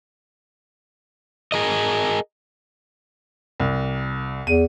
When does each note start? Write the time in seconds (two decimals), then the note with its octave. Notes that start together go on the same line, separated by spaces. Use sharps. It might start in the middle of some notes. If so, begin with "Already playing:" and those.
1.52 G#4 A#4 D#5
3.60 C2
4.47 E2 D#7